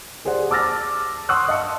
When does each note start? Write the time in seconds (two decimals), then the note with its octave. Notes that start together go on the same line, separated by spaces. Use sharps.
0.25 G4 G#4 C5 D5 F#5
0.50 A5 D6 E6 F6 A6 A#6
1.29 F#5 C6 C#6 D#6 E6 F#6
1.48 D#5 F5 A5 C#7